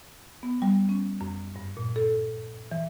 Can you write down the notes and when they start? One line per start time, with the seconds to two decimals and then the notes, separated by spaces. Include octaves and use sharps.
0.43 B3
0.62 G3
0.89 C#4
1.21 F#2
1.56 G2
1.77 A#2
1.96 A4
2.71 E3